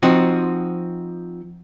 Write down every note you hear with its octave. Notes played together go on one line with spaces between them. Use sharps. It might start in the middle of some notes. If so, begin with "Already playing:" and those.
F3 C4 D#4 F#4